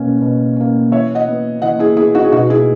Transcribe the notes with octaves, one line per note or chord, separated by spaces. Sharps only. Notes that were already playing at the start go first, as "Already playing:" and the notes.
Already playing: B2 A#3 C#4
B2
A#3 C#4
E3 C#5 E5
D#5 F#5
B3
E3 D#5 F#5
E4 G#4
B3 E4 G#4
D#4 F#4
G#4
B2 D#4 F#4
E4 G#4